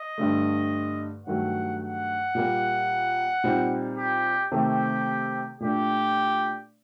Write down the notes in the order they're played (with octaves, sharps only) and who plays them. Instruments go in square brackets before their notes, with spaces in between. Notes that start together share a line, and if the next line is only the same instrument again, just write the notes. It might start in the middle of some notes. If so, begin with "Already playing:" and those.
Already playing: [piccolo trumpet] D#5
[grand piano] G2 D3 A3
[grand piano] G2 D#3 F#3 A3 [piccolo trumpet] F#5
[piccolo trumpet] F#5
[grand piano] A#2 G3 A#3
A#2 G3 C4 D#4
[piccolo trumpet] G4
[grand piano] C3 D#3 A3 C4 [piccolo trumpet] G4
[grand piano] A#2 A3 D4 [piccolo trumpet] G4